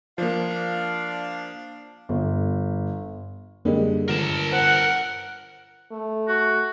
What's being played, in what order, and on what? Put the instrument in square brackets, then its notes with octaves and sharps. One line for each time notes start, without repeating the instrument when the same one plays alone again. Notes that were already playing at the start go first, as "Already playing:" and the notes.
[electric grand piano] F3 A#3 [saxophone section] D4 F5
[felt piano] G1
[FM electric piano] F#2 A#3 [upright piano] D3 G3 G#3
[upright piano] G1 [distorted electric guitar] A#4 A5
[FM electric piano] C5 [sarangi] F#5
[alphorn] A3
[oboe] F#4